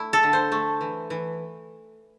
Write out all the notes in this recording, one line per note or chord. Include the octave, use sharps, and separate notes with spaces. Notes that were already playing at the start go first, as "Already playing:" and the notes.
Already playing: A3 E4
A4
D3
C5
A3
E3
E3